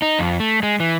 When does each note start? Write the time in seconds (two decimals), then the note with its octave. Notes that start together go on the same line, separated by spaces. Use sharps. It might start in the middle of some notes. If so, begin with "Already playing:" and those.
0.02 D#4
0.19 F2
0.40 A3
0.63 G#3
0.80 E3